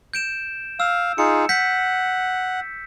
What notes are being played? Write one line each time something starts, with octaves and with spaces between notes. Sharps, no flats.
G6 D7 E7
F5 E6
D#4 F4 G#4 C#7
F#5 G6 B6 C#7